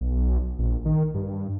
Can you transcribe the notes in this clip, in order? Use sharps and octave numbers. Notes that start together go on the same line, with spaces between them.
B1
A#1
D#3
G2